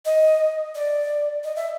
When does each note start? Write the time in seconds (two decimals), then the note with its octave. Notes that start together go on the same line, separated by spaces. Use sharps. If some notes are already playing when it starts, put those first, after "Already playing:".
0.05 D#5
0.75 D5
1.44 D#5
1.56 E5